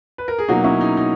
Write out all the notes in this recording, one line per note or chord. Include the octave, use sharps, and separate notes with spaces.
B4
A#4
G#4
B2 F#3 A#3 D#4 F#4
C#4 E4
D#4
D#4